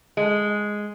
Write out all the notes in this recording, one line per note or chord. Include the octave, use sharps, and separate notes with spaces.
G#3